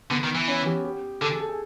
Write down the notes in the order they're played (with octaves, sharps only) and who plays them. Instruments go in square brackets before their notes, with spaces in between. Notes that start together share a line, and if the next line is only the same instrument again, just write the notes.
[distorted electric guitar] D3 [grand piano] B3
[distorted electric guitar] D#3
E3
[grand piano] C#4
G4
G4
[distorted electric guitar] D3 [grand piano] A4
[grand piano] G#4
A4
G#4